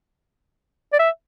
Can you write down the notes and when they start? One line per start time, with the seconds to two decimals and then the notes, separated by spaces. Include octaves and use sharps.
0.93 D5
0.99 E5